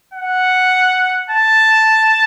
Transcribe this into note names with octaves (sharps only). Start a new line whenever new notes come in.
F#5
A5